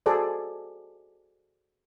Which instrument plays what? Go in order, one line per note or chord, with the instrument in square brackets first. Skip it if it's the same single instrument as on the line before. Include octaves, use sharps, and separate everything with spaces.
[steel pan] F#4 G#4 A4 C5 D5